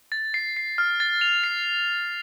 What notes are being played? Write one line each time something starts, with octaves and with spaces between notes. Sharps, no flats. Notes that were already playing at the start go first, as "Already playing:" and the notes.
A6
C7
C7
F6
A6
F7
C7